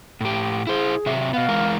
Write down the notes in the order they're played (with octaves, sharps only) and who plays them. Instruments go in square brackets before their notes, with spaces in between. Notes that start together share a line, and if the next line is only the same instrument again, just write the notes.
[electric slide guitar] A2 G4
[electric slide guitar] E4 C5 [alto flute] G#4
[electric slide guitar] C3 F#3 E5
[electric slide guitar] B2 B3 [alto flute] F5
[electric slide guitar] E3 G#3 A#4